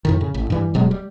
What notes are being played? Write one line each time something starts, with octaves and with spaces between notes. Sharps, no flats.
F2 A2 D#3
C#3
A1
G2 E3 G3
D#1 B2 F#3 G#3
G3